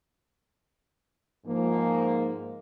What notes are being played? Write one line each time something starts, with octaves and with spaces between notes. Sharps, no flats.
G#2 F3 A#3